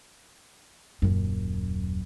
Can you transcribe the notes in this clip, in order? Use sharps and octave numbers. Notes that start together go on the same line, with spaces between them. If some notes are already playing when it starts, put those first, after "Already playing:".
D#1 F#2